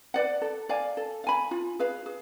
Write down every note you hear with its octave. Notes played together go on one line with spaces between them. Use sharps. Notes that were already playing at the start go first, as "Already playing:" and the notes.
B4 D5 F#5
A4
D5 F5 G#5
A4
F5 G#5 B5
F4
G#4 B4 F5
G#4